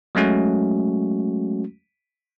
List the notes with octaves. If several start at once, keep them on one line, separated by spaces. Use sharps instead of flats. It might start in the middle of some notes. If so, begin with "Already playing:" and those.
F#3 G#3 A3 C#4 F#4